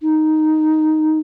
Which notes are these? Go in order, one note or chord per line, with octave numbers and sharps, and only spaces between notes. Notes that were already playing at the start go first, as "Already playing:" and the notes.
D#4